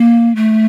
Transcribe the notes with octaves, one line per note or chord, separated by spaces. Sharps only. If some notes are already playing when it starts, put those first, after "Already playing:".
Already playing: A#3
A3